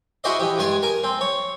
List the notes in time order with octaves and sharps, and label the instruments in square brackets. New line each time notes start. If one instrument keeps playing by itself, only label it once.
[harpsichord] E4 F#4 G#4 C5 D5 D#5
E3 G4
G2 G#3 D5 G#5
A#4 G#5
C4
C#5